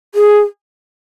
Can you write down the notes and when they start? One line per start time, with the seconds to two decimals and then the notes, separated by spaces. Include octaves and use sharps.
0.15 G#4